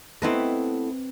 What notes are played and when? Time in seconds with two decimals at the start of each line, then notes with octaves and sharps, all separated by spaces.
0.22 A3 B3 C4 E4 B4 D#5